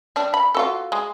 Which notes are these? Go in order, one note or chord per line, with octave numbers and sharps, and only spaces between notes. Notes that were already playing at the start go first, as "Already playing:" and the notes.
G3 D4
B5
F4 F#4 A4
G#3